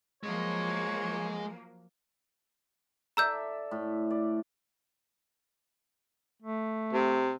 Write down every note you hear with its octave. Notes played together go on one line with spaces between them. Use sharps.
F3 F#3 G#3 A#3 C#5
A4 D5 E5 A#5 E6 G6
A2
D5
A3
C3